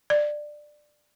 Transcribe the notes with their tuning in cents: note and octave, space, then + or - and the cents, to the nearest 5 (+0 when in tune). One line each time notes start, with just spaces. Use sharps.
D5 +15